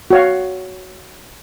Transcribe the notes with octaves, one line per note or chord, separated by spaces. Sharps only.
F#4 C#5 F5